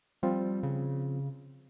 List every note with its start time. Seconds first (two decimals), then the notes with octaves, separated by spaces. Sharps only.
0.23 F3 G3 C4 F4
0.63 C#3